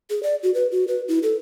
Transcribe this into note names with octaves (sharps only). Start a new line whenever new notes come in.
G#4
D5
F#4
B4
F#4
B4
E4
A4